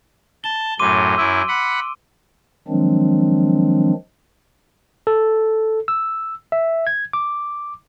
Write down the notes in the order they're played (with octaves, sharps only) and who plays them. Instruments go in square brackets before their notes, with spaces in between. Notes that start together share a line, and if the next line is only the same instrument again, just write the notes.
[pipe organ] A5 [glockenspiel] G7
[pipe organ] F#2 A2 [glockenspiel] C6 D6 D#7
[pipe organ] F#2 E4 [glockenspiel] E6 D7
[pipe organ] F#5 B5
D#3 F3 F#3 G#3 C4 D4
[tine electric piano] A4
E6
E5
G#6
D6